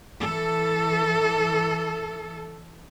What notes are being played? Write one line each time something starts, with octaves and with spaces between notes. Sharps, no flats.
E3 A4